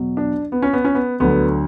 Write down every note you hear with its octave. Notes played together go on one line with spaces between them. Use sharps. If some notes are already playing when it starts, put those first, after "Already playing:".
Already playing: E2 B2 F#3
D4
B3
C#4
B3
C#4
B3
D2 D3 F#3 B3